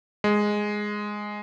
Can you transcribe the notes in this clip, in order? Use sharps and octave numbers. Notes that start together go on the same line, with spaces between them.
G#3